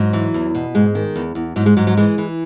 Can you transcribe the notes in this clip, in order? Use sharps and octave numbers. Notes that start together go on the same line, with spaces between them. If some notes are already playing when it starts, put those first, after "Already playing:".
Already playing: G#2 F#3
E3
E2
B2
G#2 G#3
D#3
E2
E2
G#2 F#3
G#3
G#2 F#3
F#3
E3 G#3
E3